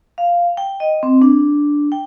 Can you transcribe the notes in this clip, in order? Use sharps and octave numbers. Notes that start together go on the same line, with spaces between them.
F5
G5
D#5
C4
D4
G5